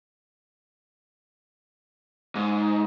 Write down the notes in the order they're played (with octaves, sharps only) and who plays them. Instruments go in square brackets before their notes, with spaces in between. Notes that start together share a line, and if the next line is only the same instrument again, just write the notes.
[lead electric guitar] G#2